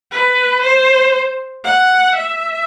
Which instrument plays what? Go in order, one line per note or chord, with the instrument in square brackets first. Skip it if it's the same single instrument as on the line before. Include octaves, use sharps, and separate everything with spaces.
[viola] B4
C5
F#5
E5